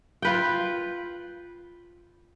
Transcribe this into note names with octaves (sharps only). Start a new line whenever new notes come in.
F4 B4 G5